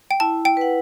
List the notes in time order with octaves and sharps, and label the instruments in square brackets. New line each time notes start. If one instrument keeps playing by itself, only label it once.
[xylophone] G5
[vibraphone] E4 [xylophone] A5
[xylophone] G5
[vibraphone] B4 F#5